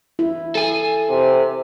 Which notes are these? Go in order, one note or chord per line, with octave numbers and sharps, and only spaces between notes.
E4
A4 G#5
C3